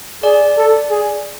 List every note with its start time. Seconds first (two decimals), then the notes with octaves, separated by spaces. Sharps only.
0.23 G#4 D5
0.57 A4
0.90 G#4